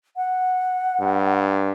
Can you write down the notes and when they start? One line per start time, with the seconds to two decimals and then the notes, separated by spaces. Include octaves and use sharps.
0.17 F#5
1.00 G2